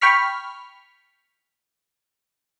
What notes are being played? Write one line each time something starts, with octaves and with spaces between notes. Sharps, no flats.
G5 B5 C#6 F6 B6